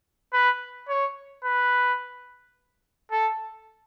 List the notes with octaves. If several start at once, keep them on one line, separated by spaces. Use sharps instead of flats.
B4
C#5
B4
A4